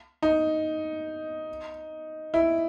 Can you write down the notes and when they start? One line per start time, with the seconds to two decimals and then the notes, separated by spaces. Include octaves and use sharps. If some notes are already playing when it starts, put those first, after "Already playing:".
0.22 D#4
2.34 E4